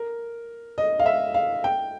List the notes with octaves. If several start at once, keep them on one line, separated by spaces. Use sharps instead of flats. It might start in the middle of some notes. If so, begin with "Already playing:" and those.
Already playing: A#4
D#5
F5
E5
F5
G5